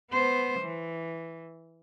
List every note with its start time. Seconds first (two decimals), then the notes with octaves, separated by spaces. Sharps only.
0.11 B3 C5
0.59 E3